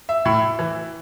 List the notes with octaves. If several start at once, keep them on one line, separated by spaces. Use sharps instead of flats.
E5
A2
E3